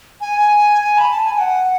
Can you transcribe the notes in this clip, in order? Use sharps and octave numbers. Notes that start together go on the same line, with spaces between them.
G#5
B5
A5
G#5
F#5